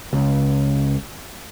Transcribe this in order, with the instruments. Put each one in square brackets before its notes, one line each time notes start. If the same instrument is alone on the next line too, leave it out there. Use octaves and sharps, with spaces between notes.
[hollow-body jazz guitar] C#2